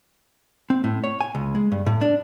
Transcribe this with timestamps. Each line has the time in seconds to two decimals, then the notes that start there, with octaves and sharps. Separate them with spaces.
0.70 C4
0.84 A2
1.04 C#5
1.21 G#5
1.35 C#2
1.55 G#3
1.72 G2
1.86 A2
2.01 D4